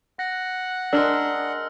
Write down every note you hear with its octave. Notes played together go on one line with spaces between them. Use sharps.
F#5 F#6 A#6
G#3 D4 A#4 E6 F6